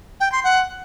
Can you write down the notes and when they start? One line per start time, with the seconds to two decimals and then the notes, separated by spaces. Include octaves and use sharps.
0.20 G5
0.32 C6
0.44 F#5